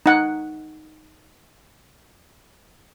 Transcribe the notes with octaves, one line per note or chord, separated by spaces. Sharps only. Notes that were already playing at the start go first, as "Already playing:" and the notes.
D#4 F#5